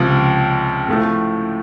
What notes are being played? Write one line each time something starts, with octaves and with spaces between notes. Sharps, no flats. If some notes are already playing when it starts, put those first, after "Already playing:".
Already playing: C#2 C3 F3
A2 F3 A3